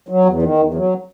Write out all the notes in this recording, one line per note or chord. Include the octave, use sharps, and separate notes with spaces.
F#3
E2
D#3
E2
F#3